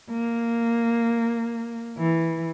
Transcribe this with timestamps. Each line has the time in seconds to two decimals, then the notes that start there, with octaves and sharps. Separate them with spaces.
0.11 A#3
1.98 E3